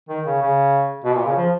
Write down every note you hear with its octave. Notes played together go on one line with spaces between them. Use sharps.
D#3
C#3
C#3
B2
A#2
C#3
F3